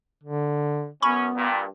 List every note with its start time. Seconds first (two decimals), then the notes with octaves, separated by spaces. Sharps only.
0.23 D3
1.02 F#2 B3 C#4 B5 C#6
1.36 G2 A#2